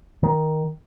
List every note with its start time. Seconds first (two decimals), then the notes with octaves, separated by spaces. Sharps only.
0.23 D#3